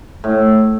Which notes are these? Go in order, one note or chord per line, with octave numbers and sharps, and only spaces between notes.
A2